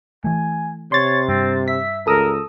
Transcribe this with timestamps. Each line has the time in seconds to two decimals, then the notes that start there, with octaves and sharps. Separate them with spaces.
0.24 E3 A3 G#5
0.92 C3 C#5 C6 A6
1.29 G2 C4
1.68 E5 B6
2.07 C#2 A4 A#4 D#6 E6